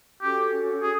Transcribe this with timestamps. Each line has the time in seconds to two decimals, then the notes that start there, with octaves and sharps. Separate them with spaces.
0.22 C#4 F#4 G4 A4
0.82 G#4